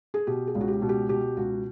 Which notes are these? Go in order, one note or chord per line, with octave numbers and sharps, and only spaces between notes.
G#4
B2 G4
G#4
C#2
F#4
G4
B2
G4
B2 G4
C#2 F#4